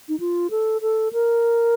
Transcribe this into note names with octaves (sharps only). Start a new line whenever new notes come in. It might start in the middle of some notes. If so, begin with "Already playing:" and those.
D#4
F4
A4
A4
A#4